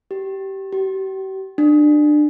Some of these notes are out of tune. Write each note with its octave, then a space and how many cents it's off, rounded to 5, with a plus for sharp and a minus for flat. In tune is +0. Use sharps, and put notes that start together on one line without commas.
G4 -20
G4 -45
D4 +25